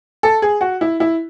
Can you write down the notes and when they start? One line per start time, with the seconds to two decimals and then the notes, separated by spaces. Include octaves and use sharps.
0.23 A4
0.42 G#4
0.61 F#4
0.81 E4
1.00 E4